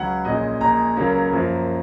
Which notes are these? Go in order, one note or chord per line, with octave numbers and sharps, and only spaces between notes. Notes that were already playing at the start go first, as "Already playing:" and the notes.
Already playing: C#2 C#3 F#3 C#4 F#5
A#1 A#2 G#3 C#4 D#5
A#1 A#2 G#3 A#5
C#2 C#3 F#3 A#3 C#4
F#2 F3 A#3